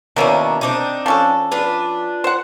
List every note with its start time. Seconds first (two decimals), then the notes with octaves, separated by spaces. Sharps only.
0.16 B2 D#3 A#3 C#4 D4 E4
0.61 C4 D4 D#4
1.06 F3 C#4 A4
1.51 D4 F4 B4
2.24 C5 F#5